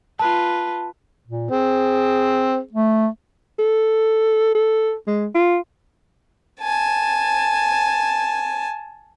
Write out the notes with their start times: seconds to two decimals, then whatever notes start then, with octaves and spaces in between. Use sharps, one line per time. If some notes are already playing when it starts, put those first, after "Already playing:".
0.19 F4 B4 A5
1.27 A#2
1.51 C4 G#4
2.73 A3
3.59 A4
4.55 A4
5.07 G#3
5.35 F4
6.61 G#5 A5